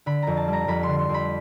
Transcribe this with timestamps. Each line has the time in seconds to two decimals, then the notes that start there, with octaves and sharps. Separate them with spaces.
0.06 D3 B5
0.22 F2 A#5
0.37 A5
0.48 G3
0.53 A#5
0.68 F2 B5
0.83 D3 C6
0.99 C6
1.09 F2
1.14 B5